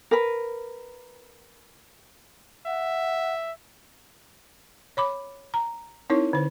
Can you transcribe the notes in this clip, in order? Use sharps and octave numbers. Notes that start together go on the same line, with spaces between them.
A#4 B4
E5 F#5
C#5 B5 D6
A#5
C4 D#4 E4 A#4 C#5
D3 C5